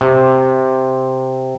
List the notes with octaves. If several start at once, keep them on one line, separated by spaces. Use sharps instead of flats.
C3